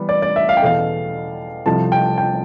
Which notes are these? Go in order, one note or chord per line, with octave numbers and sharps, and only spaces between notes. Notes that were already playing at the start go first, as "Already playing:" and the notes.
Already playing: E3 G3 B3
D5
D5
E5
F5
G5
E2 B2 A3 F5
C2 C3 F3 A3 A5
G5
G5